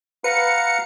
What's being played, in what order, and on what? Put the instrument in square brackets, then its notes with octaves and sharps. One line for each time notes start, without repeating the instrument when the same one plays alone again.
[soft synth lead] B4 [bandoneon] F5 F#5 A#5 [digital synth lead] C#7